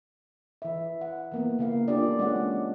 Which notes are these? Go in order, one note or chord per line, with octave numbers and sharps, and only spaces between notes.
E3 E5
F#5
E3 A#3 B3
C#3 A#3 F5
A#3 D4 F4 G4 G#4 D5
G#3 C#4 F#5